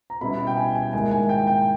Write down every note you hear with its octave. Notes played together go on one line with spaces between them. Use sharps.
A#5
B2 G3 C#4 E4 B5
G5
G#5
G#5
G#2 D#3 A#3 E4 G#5
G#5
G5
G5